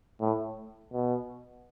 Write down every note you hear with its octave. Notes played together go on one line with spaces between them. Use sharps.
A2
B2